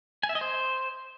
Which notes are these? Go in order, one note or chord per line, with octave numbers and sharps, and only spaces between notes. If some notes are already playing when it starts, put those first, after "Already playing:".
G#5
E5
D#5
C5